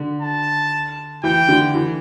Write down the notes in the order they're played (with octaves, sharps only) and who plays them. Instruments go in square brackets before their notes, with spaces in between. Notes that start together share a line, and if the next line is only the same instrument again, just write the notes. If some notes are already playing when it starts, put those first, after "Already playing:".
Already playing: [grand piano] D3
[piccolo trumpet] A5
[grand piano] E3 [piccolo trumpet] G5
[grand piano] D3
E3